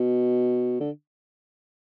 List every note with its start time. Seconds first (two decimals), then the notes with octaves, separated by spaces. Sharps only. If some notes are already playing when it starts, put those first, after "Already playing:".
Already playing: B2
0.80 D3